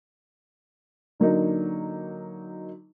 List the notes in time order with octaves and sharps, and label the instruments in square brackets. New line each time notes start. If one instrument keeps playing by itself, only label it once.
[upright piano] D3 F#3 A#3 D#4